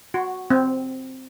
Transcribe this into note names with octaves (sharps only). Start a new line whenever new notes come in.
F#4
C4